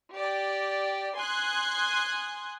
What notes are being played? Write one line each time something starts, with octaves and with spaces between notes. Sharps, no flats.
G4 D5
G#5 C6 D#6 F#6 G#6